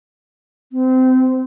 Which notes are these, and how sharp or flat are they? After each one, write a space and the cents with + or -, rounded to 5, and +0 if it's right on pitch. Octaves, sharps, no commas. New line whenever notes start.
C4 -25